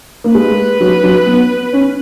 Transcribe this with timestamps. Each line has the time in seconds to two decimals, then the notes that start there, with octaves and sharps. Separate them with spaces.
0.24 A#3
0.34 G#3 B4
0.80 F#3
1.04 F#3
1.26 B3
1.73 C#4